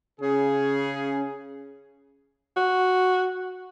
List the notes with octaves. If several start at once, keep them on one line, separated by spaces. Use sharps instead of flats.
C#3 C#4 G#4
F#4